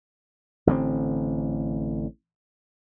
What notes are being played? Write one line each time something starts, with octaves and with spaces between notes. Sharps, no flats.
A1 D3 A#3 C4